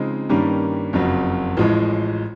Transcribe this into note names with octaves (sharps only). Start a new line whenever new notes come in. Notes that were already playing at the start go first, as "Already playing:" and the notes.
Already playing: C#3 F3 G#3 C4 D#4
G2 D#3 G3 A#3 C#4
F#1 F2 C#3 F#3
A1 A2 F3 G#3